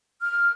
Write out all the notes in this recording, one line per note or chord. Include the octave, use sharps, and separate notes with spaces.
F6